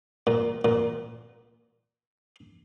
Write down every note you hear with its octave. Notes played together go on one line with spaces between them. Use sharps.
A#2
A#2